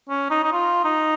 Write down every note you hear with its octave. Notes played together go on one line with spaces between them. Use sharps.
C#4
D#4
D#4
F4
D#4